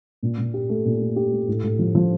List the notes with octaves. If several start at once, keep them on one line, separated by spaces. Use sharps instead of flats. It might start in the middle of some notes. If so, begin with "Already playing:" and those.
A#2
A#2
G4
A3
A#2
A3
G4
A3
A2
A2
F3
F3